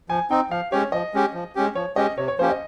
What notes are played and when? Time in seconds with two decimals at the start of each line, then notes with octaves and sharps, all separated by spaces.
0.09 F3 G#5
0.30 C4 D#4 G5
0.51 F3 F5
0.72 G#3 C#4 G4 C#5
0.92 F3 D#5
1.14 G#3 C#4 G4
1.34 F3
1.55 G#3 C#4 G4
1.75 F3 C#5
1.96 G#3 C#4 G4 D#5
2.18 C3 C#5
2.28 C#5
2.39 F3 A#3 C#4 G4 C5
2.50 D#5